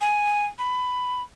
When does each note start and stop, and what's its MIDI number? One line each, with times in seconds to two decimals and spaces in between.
0.01 0.46 80
0.59 1.22 83